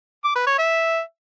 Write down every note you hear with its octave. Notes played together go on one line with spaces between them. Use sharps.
D6
B4
C#5
E5